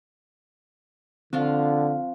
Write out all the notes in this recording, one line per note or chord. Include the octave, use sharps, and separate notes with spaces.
D3 F3 C4 F4 F5